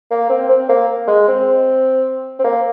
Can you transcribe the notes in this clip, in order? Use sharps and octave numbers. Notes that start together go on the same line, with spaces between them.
A#3
C4
C4
A#3
G#3
C4
C4
A#3